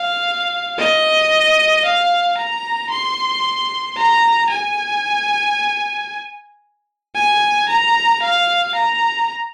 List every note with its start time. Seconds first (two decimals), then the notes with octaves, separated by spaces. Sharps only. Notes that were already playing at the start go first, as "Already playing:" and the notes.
Already playing: F5
0.78 D#5
1.85 F5
2.37 A#5
2.90 C6
3.96 A#5
4.50 G#5
7.15 G#5
7.68 A#5
8.22 F5
8.74 A#5